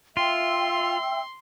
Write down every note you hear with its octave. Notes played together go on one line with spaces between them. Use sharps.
F4 E5 G5 C6 E6